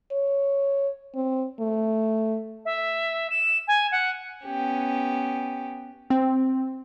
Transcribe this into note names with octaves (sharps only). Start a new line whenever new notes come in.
C#5
C4
A3
E5
E7
G#5
F#5
B3 C#4 G4
C4